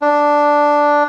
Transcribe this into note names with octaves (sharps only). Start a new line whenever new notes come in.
D4